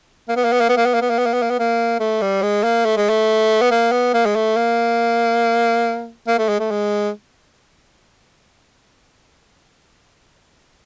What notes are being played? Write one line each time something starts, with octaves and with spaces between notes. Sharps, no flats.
A#3
B3
A#3
B3
A#3
B3
A#3
B3
A#3
B3
A#3
B3
A#3
B3
A#3
B3
A#3
A3
G3
G#3
A#3
A3
G#3
A3
B3
A#3
B3
A#3
G#3
A3
A#3
A#3
A3
G#3
A3
G#3